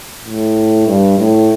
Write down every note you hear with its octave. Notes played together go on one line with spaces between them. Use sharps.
A2
G2
A2